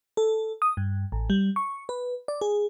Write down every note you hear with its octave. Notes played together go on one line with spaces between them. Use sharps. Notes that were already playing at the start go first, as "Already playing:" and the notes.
A4
D#6
G2
A1
G3
C#6
B4
D5
G#4